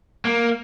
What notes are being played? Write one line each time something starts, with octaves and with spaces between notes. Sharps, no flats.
A#3